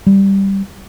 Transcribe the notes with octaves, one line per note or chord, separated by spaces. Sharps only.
G3